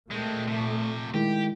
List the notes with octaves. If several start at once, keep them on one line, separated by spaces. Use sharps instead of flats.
A#2 G#3 A3 C4
C3 F3
D#3 G#3 E4 G4